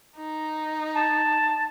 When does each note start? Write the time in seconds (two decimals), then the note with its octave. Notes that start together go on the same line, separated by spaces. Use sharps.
0.17 D#4
0.95 A5